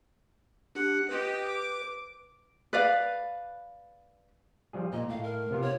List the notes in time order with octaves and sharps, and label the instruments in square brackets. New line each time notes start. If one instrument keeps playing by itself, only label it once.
[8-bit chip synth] D4 G4 [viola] F#5
[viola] G4 D#5 [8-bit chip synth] B4
[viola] D6
[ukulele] B4 D5 F5
[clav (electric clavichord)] F3 G3 G#4
[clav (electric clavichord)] A#2 A#5 [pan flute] D#5
[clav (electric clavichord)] A2 [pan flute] F5
[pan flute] A#4
[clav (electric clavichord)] C3 B3 F4
[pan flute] C#5